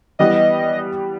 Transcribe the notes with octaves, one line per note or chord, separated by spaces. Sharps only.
E3 G3 B3 D#5